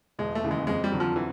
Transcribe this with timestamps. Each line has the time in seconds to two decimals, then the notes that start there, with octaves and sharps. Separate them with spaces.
0.19 E1 G#3
0.35 A3
0.43 D#2 C#3 E3
0.51 G#3
0.67 F2 G#3
0.84 G3
0.92 D3 F#3
1.00 F3
1.16 E3